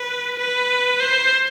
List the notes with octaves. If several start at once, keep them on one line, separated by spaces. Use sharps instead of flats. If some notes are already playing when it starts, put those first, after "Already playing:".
Already playing: B4
B4
C5